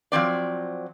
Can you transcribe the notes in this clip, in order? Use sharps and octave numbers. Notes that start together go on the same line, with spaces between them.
F3 F#3 C4 D5